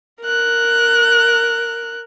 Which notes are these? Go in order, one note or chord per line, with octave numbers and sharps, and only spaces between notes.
A#4 F#6